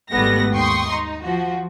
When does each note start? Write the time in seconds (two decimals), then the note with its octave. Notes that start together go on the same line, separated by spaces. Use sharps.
0.12 G#1 G#2 G3 A3 B3 A#6
0.53 D#2 G5 C6 C#6 D#6 C7
0.90 D#4
1.24 F3 F#4